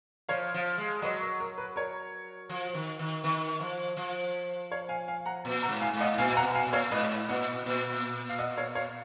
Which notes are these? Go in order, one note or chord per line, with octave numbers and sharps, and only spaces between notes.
F3 C#5 F5
F3
G#3
F#3 B4 D#5
A#4
A#4
B4
A#4 C#5
F3
D#3
D#3
D#3
F3
F3
C#5 F5
F5 G#5
F5 G#5
F#5 A#5
A#2
F#5 A#5
G#2
F5 G#5
G#2
D#5 F#5
A#2 F5 G#5
G#5
F#5 A#5
B2
F5 G#5
A#2
C#5 F5
G#2 B4 D#5
A#2 D#5 F#5
A#2
F5
D#5 F#5
C#5 F5
C#5 F5